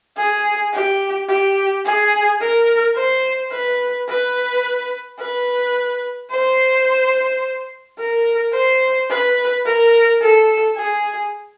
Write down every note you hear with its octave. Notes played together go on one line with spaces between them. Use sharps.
G#4
G4
G4
G#4
A#4
C5
B4
B4
B4
C5
A#4
C5
B4
A#4
A4
G#4